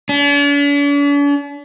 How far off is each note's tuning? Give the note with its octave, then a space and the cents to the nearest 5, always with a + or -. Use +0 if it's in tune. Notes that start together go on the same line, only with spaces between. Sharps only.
D4 -45